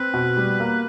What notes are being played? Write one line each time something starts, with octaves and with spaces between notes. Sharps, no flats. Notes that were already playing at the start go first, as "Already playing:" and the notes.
Already playing: C4 B4
B2
G3
A#3